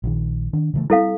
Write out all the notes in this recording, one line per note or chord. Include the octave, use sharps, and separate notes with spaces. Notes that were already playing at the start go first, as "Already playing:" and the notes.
A#1 D#3
D#3 D4
C#3 E3 A3
G3 G#3 C4 E4 A4 F5